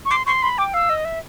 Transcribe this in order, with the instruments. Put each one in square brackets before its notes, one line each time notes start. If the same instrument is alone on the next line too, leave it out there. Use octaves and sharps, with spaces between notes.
[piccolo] C#6
[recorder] C6 [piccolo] D6
[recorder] C6 [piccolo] C#6
[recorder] B5 [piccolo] C6
[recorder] G5 [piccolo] D6
[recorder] F5 [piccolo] E6
[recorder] D#5
E5